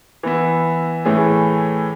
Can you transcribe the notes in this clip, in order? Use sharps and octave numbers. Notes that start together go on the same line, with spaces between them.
E3 B3 E4
A2 E3 A3 C#4 G#4